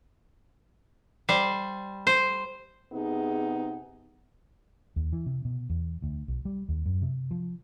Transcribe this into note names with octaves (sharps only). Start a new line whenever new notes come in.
G3 C5
C5
C3 B3 D#4 G#4
D#2
E3
C3
B2
E2
D2
B1
G3
D#2
F#2
C3
F3